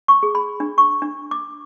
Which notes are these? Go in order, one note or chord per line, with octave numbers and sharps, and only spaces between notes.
C#6
G#4
B5
D4
C#6
D4
D6